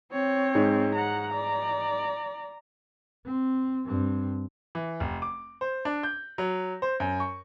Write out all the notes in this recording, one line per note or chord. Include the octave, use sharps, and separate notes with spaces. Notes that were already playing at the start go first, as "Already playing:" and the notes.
C4 C#5
G#2
F#5 A#5
D5
C4
G2 C4
E3
F1
D6
C5
D4
G6
F#3
C5
F#2
C#6